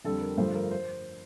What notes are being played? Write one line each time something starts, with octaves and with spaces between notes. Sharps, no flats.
F2 D3 G3 A4
A#4
G2 D3 F3 A3 C5
A#4
C5